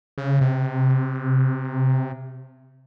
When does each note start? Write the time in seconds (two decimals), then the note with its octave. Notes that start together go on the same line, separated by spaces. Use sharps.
0.18 C#3
0.41 C3